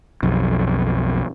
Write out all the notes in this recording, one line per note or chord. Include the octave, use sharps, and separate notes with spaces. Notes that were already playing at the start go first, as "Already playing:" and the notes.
B1 F2